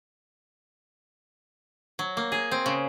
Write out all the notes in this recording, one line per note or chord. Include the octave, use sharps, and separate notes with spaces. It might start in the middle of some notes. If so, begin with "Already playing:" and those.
F#3
A#3
G#4
C4
C#3